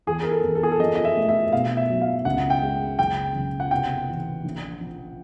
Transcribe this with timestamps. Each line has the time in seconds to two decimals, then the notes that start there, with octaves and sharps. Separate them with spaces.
0.07 E2 G#4
0.23 A#4
0.31 A4
0.43 E2
0.55 A4
0.63 G#4
0.72 A4
0.80 F3 D#5
0.95 D#5
1.05 E5
1.17 A3
1.29 E5
1.52 B2 F5
1.77 E5
1.89 F#3
2.01 F5
2.25 C#2 F#5
2.50 G5
2.62 G#3
2.98 F#1 G5
3.35 F#1
3.60 F#5
3.71 C3 G5
4.08 E3
4.44 A#1
4.81 F3